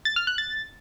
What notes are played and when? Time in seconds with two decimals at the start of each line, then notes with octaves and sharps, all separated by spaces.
0.05 A6
0.16 F6
0.27 F#6
0.38 A6